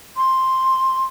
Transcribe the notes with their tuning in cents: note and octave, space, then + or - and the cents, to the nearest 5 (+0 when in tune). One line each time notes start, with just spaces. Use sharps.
C6 +5